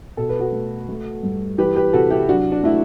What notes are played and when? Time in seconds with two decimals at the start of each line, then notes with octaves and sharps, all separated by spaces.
0.17 B2 A4
0.29 B4
0.40 F#4 A4
0.52 A3
0.89 A3
1.23 G2
1.58 E3 G4 B4
1.76 G4 B4
1.93 C3 F#4 A4
2.11 E4 G4
2.29 F#3 D4 F#4
2.52 D4
2.63 A3 E4